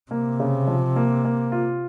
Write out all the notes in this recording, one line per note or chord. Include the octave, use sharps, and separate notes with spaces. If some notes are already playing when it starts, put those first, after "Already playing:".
C3 A#3
C#3
F3
A#3
A#3
F4